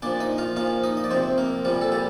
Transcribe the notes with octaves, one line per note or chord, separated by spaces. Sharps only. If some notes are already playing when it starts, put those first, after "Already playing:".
A#2 F3 D4 D5
D#4 D#5
F4 F5
A#2 F3 F4 F5
D#4 D#5
D#5
D5
C3 F3 C4 C5
A#3 A#4
A#2 F3 G3 F4
A4
G3 G4